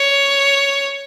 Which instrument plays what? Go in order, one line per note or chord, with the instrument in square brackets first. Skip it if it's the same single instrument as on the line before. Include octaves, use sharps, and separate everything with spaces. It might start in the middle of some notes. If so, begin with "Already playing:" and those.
Already playing: [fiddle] C#5